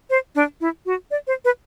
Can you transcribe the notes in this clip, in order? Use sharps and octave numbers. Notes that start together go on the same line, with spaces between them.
C5
D4
E4
F#4
D5
C5
B4